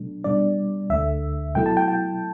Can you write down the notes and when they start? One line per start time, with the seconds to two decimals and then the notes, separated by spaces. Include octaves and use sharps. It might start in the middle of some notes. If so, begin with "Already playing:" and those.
Already playing: B2 F#3 A3 D4
0.24 B2 G3 D4 D5
0.90 D2 D3 A3 E5
1.55 B2 F#3 A3 E4 G5
1.66 A5
1.77 G5
1.88 G5